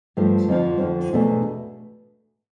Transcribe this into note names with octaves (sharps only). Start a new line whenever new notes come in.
G2 F3 A3
F2 D3 F3
F2 D3 F3
E2 B2 A3 D4